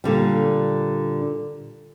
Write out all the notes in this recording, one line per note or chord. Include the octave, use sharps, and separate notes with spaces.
A#2 D3 G3